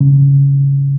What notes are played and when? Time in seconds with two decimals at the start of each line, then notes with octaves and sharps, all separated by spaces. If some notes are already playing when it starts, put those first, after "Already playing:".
0.01 C#3